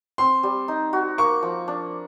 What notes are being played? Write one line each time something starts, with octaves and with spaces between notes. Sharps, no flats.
C4 C6
G3
D#4
F#4
A#3 C#6
F3
D4